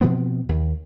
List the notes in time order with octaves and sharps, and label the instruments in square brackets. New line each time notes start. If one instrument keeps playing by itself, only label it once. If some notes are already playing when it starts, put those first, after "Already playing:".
[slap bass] B2 F3 B3 C4
D#2